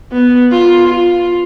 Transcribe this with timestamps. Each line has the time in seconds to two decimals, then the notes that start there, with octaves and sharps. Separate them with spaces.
0.12 B3
0.52 F4
0.88 F4